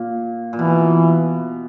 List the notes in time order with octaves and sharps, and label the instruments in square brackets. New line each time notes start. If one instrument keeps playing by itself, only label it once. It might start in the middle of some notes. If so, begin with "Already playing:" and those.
Already playing: [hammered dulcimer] A#2
A#2
[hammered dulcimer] B2 [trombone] E3